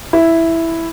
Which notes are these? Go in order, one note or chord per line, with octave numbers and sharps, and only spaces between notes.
E4